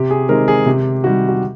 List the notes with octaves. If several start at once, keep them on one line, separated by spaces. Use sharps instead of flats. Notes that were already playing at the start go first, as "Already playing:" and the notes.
Already playing: C3 G4
G#4
D#3 G#3 C4 A#4
G#4
C3 G4
D#3 G3 F#4
F#4